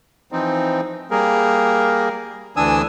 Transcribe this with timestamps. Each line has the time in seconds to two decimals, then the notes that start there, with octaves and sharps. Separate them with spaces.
0.32 E3 F3 C4 D#4
1.11 G3 A#3 G#4 A#4
2.57 D2 E3 D4 G#5 D#6 E6